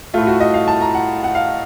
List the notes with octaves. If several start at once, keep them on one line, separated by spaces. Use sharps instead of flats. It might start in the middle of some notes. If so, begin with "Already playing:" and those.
A2 A3 F4
F#4
D#5
F5
A5
A#5
F#5
F#5
F5